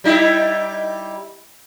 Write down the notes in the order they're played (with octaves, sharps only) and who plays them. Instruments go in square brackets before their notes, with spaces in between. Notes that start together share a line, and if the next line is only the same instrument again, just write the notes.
[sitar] G3 D#4 E4